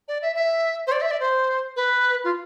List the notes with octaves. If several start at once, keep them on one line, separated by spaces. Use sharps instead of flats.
D5
E5
E5
C5
D5
E5
D5
C5
B4
F4